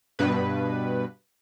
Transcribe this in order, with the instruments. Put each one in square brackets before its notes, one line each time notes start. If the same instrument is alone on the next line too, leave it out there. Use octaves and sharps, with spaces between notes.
[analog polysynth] G2 B2 B4